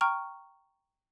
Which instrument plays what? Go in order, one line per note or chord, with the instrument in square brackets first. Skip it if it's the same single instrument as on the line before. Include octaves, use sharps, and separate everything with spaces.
[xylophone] G5 A#5 C#6 F6